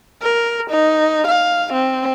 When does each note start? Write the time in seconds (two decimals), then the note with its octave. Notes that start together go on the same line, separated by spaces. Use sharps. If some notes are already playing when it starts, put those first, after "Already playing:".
0.22 A#4
0.70 D#4
1.27 F5
1.73 C4